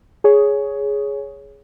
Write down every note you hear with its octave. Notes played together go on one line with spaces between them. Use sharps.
G#4 C#5